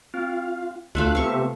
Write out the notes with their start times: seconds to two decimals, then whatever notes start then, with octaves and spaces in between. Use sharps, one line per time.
0.14 C4 F4 F5
0.95 D2 A3 F4 E5 F5 F#6
1.15 C3 B3 E5 F5 C#6